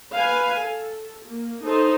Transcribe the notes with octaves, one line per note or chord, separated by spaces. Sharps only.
B4 F5 G#5
A4
A#3
D#4 A4 C5